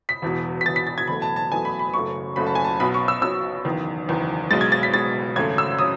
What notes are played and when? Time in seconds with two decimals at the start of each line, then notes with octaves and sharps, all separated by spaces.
0.09 B6
0.22 E1 E2 B2
0.61 B6
0.66 E1 E2 B2 A6
0.76 B6
0.87 A6
0.98 G#6
1.08 F#1 E2 B2 A3 B5
1.22 A5
1.36 A5
1.51 F#1 E2 B2 A3 G#5
1.65 B5
1.79 B5
1.94 F#1 F#2 C#3 F#3 A3 C#6
2.36 F#1 F#2 C#3 F#3 A3 B5
2.47 A5
2.55 G#5
2.64 A5
2.80 B1 B2 F#3 B3 B5
2.94 C#6
3.08 E6
3.22 B1 B2 F#3 B3 E6
3.65 F#1 E2 D#3
4.08 F#1 E2 D#3
4.51 B1 B2 G#3 A6
4.61 G#6
4.72 A6
4.83 B6
4.93 B1 B2 G#3 A6
5.36 G#1 F#2 C#3 F#3 A3 G#6
5.58 E6
5.79 C#3 F#3 D#6